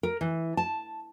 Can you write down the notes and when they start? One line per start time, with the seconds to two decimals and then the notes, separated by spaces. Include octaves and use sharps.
0.03 A#4
0.21 E3
0.57 A5